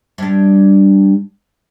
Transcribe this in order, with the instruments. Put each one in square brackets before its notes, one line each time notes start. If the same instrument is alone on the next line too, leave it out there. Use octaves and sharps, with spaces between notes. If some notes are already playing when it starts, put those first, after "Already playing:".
[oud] G2 D4